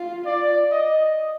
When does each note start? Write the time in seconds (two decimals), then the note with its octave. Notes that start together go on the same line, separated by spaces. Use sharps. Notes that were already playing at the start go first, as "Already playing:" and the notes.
Already playing: F4
0.26 D5
0.72 D#5